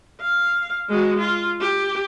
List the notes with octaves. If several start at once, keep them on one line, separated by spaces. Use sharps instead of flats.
F5
G#3 F#4
F4
G4